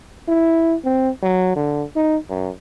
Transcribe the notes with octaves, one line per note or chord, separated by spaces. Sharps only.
E4
C4
F#3
D3
D#4
F#2